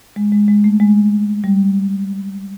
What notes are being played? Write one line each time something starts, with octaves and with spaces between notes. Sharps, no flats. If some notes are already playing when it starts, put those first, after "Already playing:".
G#3
G#3
G#3
A3
G#3
G3